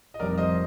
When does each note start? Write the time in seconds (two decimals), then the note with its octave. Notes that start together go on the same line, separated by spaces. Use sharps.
0.14 D#5
0.19 F1 F2 D#3 G3 A#4 D5
0.38 C5 D#5